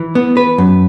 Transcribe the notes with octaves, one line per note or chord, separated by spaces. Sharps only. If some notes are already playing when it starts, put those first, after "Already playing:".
Already playing: E3
B3
B4
F#2